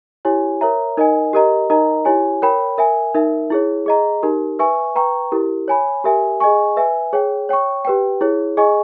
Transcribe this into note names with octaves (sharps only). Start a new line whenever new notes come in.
E4 G4 C#5 G#5
A#4 C#5 E5 A#5
D#4 A#4 D#5 G#5
G4 A#4 D#5 A#5
D#4 A#4 D#5 A#5
E4 G4 C#5 G#5
A#4 C#5 G5 B5
A#4 E5 G#5
D#4 A#4 E5
E4 G#4 C#5
G#4 D#5 A#5
D#4 G4 A#4
B4 E5 G#5 C#6
B4 G5 A#5 C#6
E4 G4 A#4
C#5 G#5 B5
G4 A#4 E5 G#5
G#4 D#5 G#5 C#6
B4 E5 G#5
G#4 C#5 G5
C#5 G5 C#6
G4 B4 G5
E4 G#4 C#5
G#4 D#5 G#5 C#6